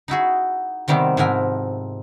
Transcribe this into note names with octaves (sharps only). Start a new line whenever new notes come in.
D#4 E4 F#4 G#4
C3 D#3 G3 B3 C4
G#2 F3 E4 A#4 G#5